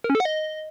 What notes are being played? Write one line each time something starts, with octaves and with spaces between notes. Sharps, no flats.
A#4
C#4
A4
F#5
D#5